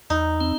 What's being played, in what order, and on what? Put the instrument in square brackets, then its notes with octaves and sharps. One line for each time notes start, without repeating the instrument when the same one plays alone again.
[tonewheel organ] E2 [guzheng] D#4
[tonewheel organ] C4